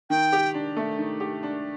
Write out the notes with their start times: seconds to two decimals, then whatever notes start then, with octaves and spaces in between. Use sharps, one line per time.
0.10 D#3 G5
0.33 G4
0.54 D4
0.77 A3
0.99 D#3
1.20 G4
1.43 D4